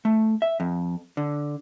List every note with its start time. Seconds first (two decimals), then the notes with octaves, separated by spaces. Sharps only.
0.05 A3
0.42 E5
0.60 F2
1.17 D3